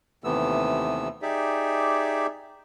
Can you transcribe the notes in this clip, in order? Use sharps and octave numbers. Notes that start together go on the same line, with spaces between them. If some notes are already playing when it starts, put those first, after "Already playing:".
D#2 C3 E3 A3 B3 E6
D#4 G4 G#4 D5 E5